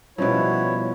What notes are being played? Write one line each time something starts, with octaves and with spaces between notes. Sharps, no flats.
B2 F3 G3 C#4 E4 F#4 C#5